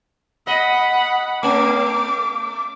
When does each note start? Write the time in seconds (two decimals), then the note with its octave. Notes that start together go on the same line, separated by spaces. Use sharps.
0.47 D#5 F#5 B5
1.43 A3 C#4 D6